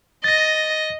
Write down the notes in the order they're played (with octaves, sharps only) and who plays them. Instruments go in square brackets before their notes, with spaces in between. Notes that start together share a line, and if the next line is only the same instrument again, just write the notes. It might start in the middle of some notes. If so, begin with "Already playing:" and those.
[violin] D#5 [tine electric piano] A6 A#6